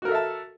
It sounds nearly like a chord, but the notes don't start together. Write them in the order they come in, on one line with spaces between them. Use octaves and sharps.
F#4 A#4 A4 E5 A5